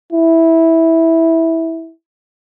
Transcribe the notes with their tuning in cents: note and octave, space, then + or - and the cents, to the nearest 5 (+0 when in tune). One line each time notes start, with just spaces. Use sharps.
E4 -10